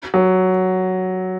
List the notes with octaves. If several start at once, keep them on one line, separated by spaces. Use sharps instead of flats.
F#3